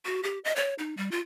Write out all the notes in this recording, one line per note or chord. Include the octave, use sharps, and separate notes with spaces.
F#4
G4
D#5
C#5
D#4
G3
F4